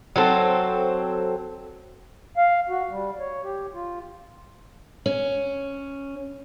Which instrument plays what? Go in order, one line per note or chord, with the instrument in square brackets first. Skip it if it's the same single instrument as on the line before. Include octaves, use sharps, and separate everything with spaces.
[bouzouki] F#3 C4 A4
[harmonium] F5
F#4
G3
C#5
G4
F4
[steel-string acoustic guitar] C#4